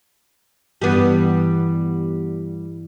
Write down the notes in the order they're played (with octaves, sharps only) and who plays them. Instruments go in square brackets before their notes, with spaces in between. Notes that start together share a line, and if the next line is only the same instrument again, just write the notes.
[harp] G2 E3 [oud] G3 B3